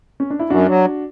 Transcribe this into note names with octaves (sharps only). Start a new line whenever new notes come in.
C#4
D4
E4
F#2 D4 F#4
F#3